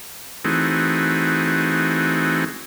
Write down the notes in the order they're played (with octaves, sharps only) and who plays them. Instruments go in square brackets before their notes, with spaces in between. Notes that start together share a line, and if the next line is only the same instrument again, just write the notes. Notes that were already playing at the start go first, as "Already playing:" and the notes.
[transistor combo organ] E3 A3 C4 D#4 F#4 G#4